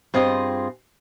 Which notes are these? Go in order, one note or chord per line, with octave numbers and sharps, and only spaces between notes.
G2 C4 F4 G#4 D#5